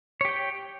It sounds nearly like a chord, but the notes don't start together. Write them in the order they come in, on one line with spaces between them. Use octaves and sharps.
C#5 G4 G5